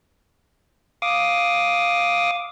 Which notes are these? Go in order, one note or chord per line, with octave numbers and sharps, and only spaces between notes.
F5 D6 D#6